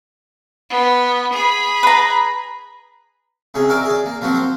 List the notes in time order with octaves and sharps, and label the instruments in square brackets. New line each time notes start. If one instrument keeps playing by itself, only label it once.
[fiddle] B3
G#4 B5
[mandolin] B4 A#5
[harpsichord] C#2 C3 C#4 G#4
F#4 A#4 D5 E5
G#4 D5
A#3
F3 F#3 A#3 C4 F#4
C5